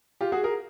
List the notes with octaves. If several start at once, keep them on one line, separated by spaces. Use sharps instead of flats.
F4 G4
F#4 G#4
G#4 A#4